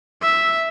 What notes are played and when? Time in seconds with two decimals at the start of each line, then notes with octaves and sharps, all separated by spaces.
0.22 E5